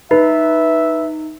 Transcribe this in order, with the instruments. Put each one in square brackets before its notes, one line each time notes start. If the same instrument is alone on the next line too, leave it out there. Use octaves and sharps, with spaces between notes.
[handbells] D#4 [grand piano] B4 [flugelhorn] E5